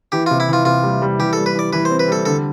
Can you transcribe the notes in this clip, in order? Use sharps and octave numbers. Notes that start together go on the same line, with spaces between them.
E3 G4
F4
C3
E4
E3 F4
C3 F4
G3
G3
E3 G4
G3 A4
B4
E3 D5
E3 B4
C5
C4
B4
G3 A4
D3 A4